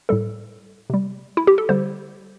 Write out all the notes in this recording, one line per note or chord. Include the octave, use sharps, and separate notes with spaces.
A2 G3 A4
C3 G3
E4
G4
A4
D3 G3 C5